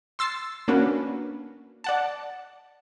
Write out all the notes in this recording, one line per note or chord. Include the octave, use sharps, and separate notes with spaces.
C6 E6 A6 C7
A#3 C#4 D4 F#4 B4
D5 F#5 A5